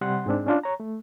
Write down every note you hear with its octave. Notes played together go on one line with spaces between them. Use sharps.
C3 G3 F#5 C6
G#2 G#3 C4 D4
C#4 D4 F4
C#5 A#5
A3